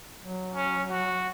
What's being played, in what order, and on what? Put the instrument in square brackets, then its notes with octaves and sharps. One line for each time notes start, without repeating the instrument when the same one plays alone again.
[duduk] F#3
[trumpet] C#4
F#4